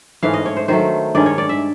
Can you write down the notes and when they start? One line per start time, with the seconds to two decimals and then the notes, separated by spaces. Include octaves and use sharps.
0.23 G#2 E3 A3 C#4 F5
0.34 D#5
0.46 C#5
0.57 C5
0.68 D#3 F#3 A3 C5
1.15 G2 D#3 G#3 C#4 D5
1.26 C#5
1.38 D5
1.49 E5